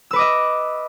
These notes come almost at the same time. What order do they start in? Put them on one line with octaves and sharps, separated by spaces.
E6 B4 D6 D#5 E5